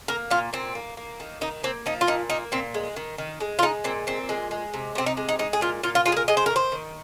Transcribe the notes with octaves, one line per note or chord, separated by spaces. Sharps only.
A#3 A#4
A#2 F4
A#2 C4
A#3
A#3
D#3
D#3 D#4
A#3 C4
F3 D#4
F4
A#2 D#4
A#3 D#4
A#2 C4
G#3
D#3
D#3
G#3
F4
G#3 D#4
A#2 C4
A#2 C4
G#3
G#3
C3
C3 C4
D#4
G#3
D#4
G#3 D#4
G#4
A#2 F4
A#2 F4
F4
G#3 F4
G#4
A#4
G#3 D#5
C5
A#4
D#3
C5
D#3